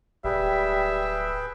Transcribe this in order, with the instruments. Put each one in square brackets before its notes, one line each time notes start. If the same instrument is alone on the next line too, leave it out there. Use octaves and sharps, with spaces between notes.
[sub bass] D1 [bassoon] G3 [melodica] G#4 B4 G5 [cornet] E5